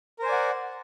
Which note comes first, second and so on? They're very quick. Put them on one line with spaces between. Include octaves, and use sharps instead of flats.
A#4 C5 G#5 D5 F#5